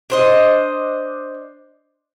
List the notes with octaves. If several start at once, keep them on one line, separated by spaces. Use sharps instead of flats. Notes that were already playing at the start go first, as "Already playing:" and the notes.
D4 C5 D#5